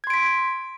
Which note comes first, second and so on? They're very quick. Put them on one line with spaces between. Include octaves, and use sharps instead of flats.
G#6 C6 D7 B6